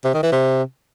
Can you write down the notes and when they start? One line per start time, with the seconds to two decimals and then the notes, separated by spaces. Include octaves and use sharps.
0.05 C3
0.14 D#3
0.23 E3
0.32 C3